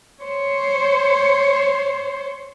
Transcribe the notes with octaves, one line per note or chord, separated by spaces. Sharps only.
C5 C#5